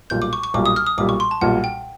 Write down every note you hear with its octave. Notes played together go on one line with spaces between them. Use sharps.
B1 A#2 G3 G6
D6
C#6
C#6
B1 A#2 G3 D6
D#6
F6
D#6
B1 A#2 G3 D6
C#6
C6
A5
B1 A#2 G3 F#5
G5